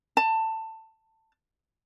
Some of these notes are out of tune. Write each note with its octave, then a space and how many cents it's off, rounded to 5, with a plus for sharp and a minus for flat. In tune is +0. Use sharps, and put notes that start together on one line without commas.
A5 +15